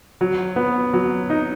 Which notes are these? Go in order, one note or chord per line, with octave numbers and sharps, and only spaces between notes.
F#3
B3
F#3
D#4